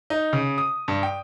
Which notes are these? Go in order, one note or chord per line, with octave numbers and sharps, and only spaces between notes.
D#4
C#3
D#6
G2
G5